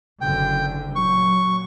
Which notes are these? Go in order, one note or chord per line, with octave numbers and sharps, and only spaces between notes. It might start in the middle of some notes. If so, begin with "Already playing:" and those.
F#1 D3 G5
A#2 F#3 C#6